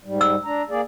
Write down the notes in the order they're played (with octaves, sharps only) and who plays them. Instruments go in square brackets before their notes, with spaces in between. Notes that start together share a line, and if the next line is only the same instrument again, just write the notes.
[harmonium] G#2 G3
[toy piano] E6
[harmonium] D4 A#5
A#3 G#4 D5